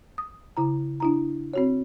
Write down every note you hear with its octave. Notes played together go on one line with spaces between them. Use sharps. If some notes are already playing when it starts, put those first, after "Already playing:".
D#6
C#3 E4 A#5
D4 E4 A#5
C4 F#4 C#5